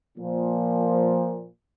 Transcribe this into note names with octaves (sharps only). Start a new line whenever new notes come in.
A#2 F3